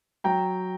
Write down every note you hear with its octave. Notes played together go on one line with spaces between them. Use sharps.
F#3 G5 A#5